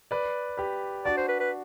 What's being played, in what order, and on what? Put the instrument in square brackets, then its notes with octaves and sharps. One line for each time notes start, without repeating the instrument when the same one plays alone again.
[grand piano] B4 D5
G4 B4
[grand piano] D4 F#4 [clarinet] D5
[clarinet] C5
B4
B4